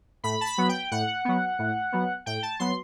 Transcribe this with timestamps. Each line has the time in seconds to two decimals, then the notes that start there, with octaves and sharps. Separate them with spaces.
0.24 A2 B5
0.41 A5
0.46 B5
0.58 F#3 B3
0.69 G5
0.91 A2 F#5
1.25 F#3 B3
1.59 A2
1.92 F#3 B3
2.26 A2 G5
2.43 A5
2.59 F#3 B3 C6